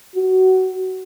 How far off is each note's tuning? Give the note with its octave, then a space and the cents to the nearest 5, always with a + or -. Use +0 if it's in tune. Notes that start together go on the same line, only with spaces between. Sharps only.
F#4 +20